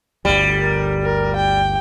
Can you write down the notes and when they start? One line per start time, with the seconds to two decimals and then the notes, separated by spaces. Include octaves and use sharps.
0.25 G1 D2 G3
0.60 A#4
1.02 A#4
1.36 G5